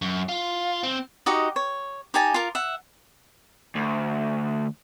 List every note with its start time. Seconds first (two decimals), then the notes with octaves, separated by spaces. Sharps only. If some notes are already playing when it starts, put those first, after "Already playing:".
0.02 F#2
0.29 F4
0.84 C4
1.26 D#4 F#4 G4 D#5
1.56 C#5
2.14 D#4 G4 G#5 A5
2.34 F4 A#4
2.55 E5 F#5
3.76 D2